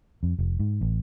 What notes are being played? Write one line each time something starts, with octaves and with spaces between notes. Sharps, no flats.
F2
F1
G#2
A1